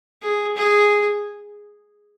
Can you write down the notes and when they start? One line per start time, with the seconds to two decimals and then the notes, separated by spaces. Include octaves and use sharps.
0.22 G#4
0.56 G#4